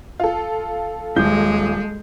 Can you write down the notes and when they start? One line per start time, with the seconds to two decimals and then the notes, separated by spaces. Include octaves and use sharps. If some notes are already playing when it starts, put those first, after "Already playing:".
0.20 F4 A4
1.16 D#1 G#3 G6